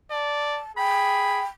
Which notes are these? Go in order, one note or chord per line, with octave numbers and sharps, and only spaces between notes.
D5 A5
G#4 G5 B5